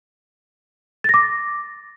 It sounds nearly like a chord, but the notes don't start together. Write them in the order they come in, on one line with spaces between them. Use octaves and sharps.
A6 A#6 D6